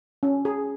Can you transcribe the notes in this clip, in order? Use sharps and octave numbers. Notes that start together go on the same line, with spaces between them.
C#4
G#4